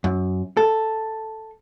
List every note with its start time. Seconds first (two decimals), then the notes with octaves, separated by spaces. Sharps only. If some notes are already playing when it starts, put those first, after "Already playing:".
0.04 F#2
0.57 A4